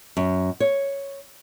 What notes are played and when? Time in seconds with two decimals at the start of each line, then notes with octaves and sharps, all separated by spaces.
0.17 F#2
0.60 C#5